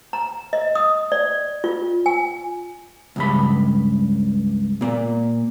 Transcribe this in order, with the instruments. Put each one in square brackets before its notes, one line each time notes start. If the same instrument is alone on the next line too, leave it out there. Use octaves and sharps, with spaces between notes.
[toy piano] A#5
D#5
D#6
D5
F4
G#5
[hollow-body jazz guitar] C#2 G2 B5
A#2 A#3